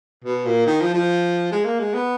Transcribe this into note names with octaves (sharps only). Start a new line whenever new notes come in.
B2
A#2
D#3
F3
F3
G#3
A#3
G#3
B3